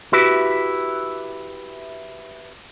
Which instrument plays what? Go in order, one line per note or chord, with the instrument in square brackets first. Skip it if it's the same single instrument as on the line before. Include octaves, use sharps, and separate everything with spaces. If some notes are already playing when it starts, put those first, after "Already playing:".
[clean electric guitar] E4 F#4 G4 B4 E5